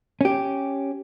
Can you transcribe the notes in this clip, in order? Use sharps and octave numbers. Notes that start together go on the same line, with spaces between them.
C#4 G4